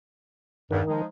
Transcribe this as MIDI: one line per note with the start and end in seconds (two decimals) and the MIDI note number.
0.71 0.81 40
0.71 0.81 43
0.71 1.02 51
0.87 1.05 53
0.87 1.05 56
0.87 1.05 63